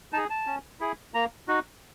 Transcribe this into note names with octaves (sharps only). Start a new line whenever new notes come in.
D#4 G#4 A5
A5
C#4
E4 G#4
A#3 A#5
D#4 F#4